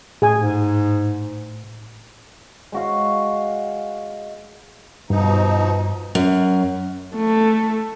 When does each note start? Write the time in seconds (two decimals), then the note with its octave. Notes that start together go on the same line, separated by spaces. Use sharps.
0.22 A2 G#4 G#5
0.40 G#2
2.72 G#3 F#4 F5
5.10 G2 B2 F3 D#4
6.15 F#2
7.15 A3